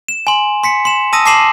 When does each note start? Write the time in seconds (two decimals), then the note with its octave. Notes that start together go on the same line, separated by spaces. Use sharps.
0.08 E7
0.27 G#5 C6
0.64 C6 B6 C#7
0.85 C6 E7
1.13 A5 D#6 E6 A#6 D#7
1.26 A5 D6 C7 E7 F#7